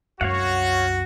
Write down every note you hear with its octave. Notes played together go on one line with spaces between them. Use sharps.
C2 F#2 F#4 C#5 F5 F#5